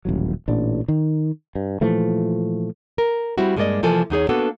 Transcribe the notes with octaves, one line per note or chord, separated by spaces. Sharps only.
D#1 A1 F#3
A1 A#2 D4
D#3
G2
A#2 E3 F3 A3
A#4
G3 C4 E4 F#4
G2 G#3 A#3 C#4 D5 D#5
C3 E3 F3 A#3 A4 G#5
E2 D#4 G#4 C#5
A#3 B3 D4 F#4 A4 B4